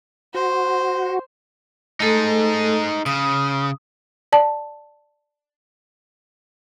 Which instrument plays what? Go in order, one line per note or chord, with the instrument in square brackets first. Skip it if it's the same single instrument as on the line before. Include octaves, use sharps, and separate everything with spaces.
[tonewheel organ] F#4 [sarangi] C5
[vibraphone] A3 A4 [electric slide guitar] D#4 G#4
[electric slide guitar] C#3 [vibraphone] D#6
[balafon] D5 A5